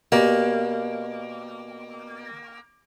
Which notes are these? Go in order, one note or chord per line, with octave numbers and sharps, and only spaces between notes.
B2 A#3 G4 D5